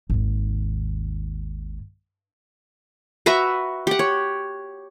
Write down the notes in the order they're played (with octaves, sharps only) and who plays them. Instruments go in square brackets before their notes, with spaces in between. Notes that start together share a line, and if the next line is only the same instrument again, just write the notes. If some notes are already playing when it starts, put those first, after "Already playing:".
[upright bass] G#1 D#2
[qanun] F#4 B4 E5 A#5
G4 F#5
C#5